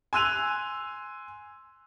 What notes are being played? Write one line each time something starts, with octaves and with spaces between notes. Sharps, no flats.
G#5 C6 E6 F#6 D#7 F7